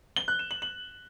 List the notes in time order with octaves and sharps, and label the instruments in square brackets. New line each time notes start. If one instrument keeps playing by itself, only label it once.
[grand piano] G7
F#6
E7
F#7
F#7